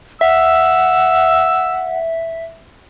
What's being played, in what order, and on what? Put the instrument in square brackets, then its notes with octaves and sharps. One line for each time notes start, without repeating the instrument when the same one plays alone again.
[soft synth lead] E5 [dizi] F#5 [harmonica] E6